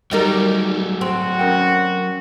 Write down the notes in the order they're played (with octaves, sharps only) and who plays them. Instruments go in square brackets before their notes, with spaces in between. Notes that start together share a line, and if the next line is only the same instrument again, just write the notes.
[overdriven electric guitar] F#3 A3 [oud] G3 D#4 A#4
[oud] C4 [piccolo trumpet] F#4
[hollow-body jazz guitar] C#4 A#4 G5